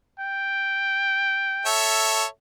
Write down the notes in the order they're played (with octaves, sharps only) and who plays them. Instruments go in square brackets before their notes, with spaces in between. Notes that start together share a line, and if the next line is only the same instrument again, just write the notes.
[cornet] G5
[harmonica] A4 C#5 E5